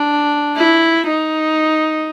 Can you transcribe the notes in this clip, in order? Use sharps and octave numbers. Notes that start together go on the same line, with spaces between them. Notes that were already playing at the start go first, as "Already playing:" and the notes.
Already playing: D4
E4
D#4